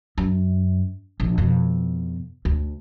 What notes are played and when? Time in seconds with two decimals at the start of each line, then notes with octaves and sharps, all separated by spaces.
0.18 F#2
1.20 A#1
1.38 F2 B2
2.45 D2